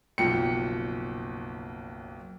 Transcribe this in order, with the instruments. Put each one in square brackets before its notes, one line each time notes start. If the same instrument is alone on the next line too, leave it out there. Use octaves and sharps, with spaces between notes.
[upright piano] F#1 B1 F3 G5 C#7